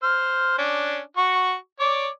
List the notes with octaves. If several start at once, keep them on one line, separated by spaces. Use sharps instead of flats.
C5 F6
C#4 D4
F#4 C#6
C#5 D5 D6